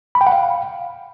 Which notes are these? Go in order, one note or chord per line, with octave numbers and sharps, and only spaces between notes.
B5
G5
F#5
F5